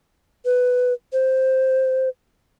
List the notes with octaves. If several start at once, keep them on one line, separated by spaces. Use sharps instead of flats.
B4
C5